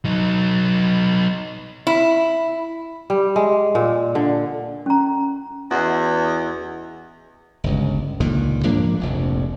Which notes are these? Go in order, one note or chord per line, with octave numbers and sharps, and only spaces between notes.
F#3 D#4
E4
G3
G#3
A#2
D3
C#4 A#5
E2 F#4 G#4 D#5
G1 C#2
C#2 A#2 D3 D#3
G#2 F3 A#3 D4
F1 A#1 F2